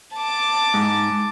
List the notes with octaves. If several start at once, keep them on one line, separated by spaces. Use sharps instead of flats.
A5 D6
G#2